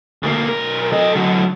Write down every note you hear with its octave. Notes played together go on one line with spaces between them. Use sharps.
D2 A#3
B1 A#4
A4 D#5
D3 F#3